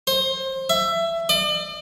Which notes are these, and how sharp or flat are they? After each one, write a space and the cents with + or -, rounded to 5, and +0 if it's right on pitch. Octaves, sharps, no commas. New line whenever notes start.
C5 +25
E5 +20
D5 +40